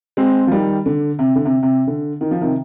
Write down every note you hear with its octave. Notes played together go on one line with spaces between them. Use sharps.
G#3 C4
F3
D#3 G3
D3
C3
D3
C3
C3
D3
D#3
F3
C3 D#3